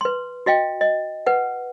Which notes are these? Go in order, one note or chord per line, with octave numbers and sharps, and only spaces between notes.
B4 C6
F#4 D#5 F5 G5
D#5
B4 F#5